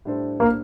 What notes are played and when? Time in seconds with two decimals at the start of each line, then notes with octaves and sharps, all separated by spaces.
0.05 A2 G3 D4 A4 C5
0.40 A#3